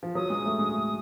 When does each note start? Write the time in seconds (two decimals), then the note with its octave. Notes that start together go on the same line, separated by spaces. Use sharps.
0.03 F3
0.15 F#3 D#6
0.30 G#3
0.46 A3
0.59 G#3
0.72 A3